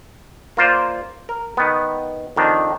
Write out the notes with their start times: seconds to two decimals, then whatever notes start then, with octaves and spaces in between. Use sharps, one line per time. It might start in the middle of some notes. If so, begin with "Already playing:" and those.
0.57 A#3 F4 C5 D5
1.29 A#4
1.57 D#3 B3
2.36 F2 D#3 D4